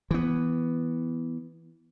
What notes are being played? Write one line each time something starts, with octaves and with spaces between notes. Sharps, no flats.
E3 B3